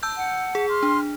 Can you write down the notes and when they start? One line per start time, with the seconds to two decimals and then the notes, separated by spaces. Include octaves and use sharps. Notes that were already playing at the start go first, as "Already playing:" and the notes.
0.03 A5 E6 G6
0.16 F#5
0.55 G#4
0.69 C6 F6
0.83 D4